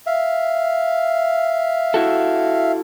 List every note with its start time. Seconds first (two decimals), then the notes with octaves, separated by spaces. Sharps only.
0.07 E5 F5
1.94 E4 F#4 A4